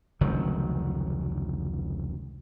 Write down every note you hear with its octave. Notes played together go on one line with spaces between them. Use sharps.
F1 C#2 D#3 F#3